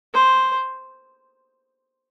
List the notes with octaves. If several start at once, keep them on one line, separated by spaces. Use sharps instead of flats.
C5